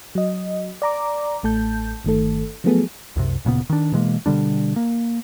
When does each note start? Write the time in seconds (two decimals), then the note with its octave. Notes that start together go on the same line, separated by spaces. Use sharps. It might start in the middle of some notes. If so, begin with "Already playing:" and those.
0.15 F#3 D#5
0.82 D5 A#5 D6
1.43 A1 A3 A5 G6
2.05 G1 D#3 A3 A4
2.64 F3 F#3 A3 B3 G#4 A4
3.16 C2 F#2 C3
3.45 D1 A#2 C#3 B3
3.69 D#3 D4
3.92 B2 E3 G#3 A#3
4.26 B2 D3 G3 D4
4.76 A#3